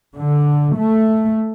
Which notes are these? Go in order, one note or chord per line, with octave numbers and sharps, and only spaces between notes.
D3
A3